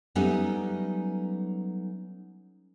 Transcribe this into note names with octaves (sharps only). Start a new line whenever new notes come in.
F#3 G3 A3 B3 C#4 D#4